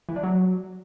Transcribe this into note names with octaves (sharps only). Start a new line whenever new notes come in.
E3
D4
F#3